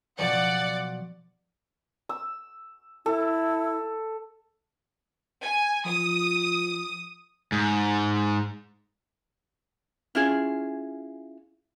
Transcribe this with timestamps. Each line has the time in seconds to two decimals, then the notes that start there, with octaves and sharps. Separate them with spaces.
0.18 B2 F3 F#3 D5 F#5
2.09 E6
3.06 E4 A4
5.42 G#5
5.86 F3 D#6
7.52 G#2
10.15 C#4 E4 F4 G#4